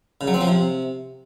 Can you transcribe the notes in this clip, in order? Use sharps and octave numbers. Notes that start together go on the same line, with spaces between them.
C#3
F#3
C4
F3
C3